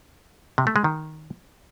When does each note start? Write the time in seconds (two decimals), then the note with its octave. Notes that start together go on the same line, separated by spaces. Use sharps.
0.58 C3
0.67 A3
0.76 G#3
0.84 D#3